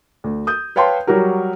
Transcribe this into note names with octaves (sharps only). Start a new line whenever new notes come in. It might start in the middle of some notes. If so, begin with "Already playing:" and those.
D2
D#6 G6
B4 C#5 F5 G5 A5 C6
F#3 G3 F#4 G4 A#4